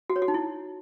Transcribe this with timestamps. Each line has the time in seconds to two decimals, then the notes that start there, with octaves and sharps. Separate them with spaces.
0.10 F#4
0.16 C#5
0.22 F#4
0.28 D#4
0.34 E4